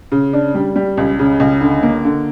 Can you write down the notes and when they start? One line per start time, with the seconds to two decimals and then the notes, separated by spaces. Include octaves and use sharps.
0.12 C#3
0.33 D4
0.54 G3
0.76 G3
0.97 C#2
1.19 C#3
1.40 C#2
1.61 D3
1.83 A#3
2.05 D3